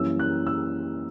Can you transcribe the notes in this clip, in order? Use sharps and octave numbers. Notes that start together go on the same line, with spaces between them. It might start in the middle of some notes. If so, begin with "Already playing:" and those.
Already playing: F#2 E3 G3 A#3 C#4 E6
F#6
E6